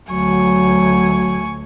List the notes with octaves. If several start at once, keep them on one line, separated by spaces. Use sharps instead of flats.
D2 F#3 A3 G#5 C#6